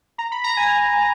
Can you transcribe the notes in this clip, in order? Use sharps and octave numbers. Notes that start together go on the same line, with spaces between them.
A#5
B5
A#5
G#5